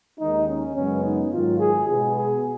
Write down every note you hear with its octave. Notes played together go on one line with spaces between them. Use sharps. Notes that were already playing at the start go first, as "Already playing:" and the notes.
D#2 D#3 G#3 D#4
C#4
F#2 C#3 G#3 B3 C#4
D#4
G#2 D#3 F#3 F4
G#4
B2 G#3 B3 G#4
G#4